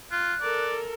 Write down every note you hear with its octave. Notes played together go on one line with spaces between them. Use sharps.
F4 F#6
A4 A#4 D5